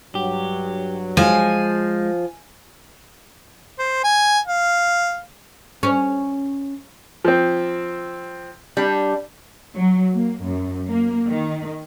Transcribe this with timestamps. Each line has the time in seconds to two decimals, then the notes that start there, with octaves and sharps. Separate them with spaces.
0.15 G2 F#3 G4
1.17 F3 G#3 G#5
3.79 C5
4.04 G#5
4.47 F5
5.83 C#4
7.25 F3 C4
8.77 G3 D4
9.76 F#3
10.14 A#3
10.46 F#2
10.90 A#3
11.28 D#3